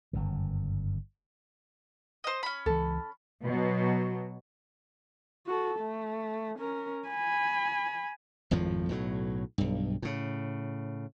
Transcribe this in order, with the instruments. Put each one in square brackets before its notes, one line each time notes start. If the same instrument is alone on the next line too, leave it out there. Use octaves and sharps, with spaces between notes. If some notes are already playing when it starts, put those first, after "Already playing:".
[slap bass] G1 F#2 C#3
[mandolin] C5 D#5
C#4 B5
[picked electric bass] C#2 E3 [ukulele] A4
[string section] B2 F#3
[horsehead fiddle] F#4 A4
A3
C#4 A#4
G#5 B5
[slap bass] G#1 F2 A2 F3
B1 A2 F#3
B1 G2
A2 C#3